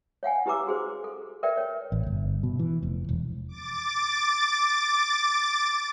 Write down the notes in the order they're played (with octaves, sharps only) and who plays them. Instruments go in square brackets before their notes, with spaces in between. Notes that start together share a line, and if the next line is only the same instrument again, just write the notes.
[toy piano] C#5 F5 F#5 G#5
E4 G4 B4 A#5 D6 E6
F#4 G#4 C5
A4
A#4 B4 D5 E5 G5
C#5
[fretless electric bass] A1
G1
B2
E3
F1
E1
[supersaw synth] D6 A6